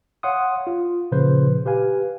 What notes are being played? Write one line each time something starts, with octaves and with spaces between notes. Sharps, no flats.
C#5 F5 F#5 C6 D#6
F4
A#2 C#3 F3 B4 C5
G4 B4 F5 G#5